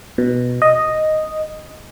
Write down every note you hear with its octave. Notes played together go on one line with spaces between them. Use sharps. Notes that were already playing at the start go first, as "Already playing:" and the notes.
B2
D#5